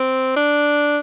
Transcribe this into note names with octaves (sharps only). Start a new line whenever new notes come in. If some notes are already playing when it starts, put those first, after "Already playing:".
Already playing: C4
D4